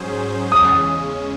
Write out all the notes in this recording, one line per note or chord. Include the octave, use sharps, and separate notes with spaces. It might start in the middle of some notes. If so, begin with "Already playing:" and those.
Already playing: G#2 F#3 C#4 G#4 C5
E2 C#3 G#3 C#4 D#6